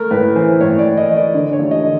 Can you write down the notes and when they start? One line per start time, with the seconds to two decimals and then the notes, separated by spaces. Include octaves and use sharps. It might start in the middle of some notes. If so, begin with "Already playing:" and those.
Already playing: A3 A#4
0.11 A2 B4
0.35 E3 C5
0.60 A2 C#5
0.78 D5
0.85 A2
0.97 D#5
1.10 E3
1.16 D5
1.34 D3 D5
1.53 C#5
1.59 A1
1.71 D#5
1.84 D3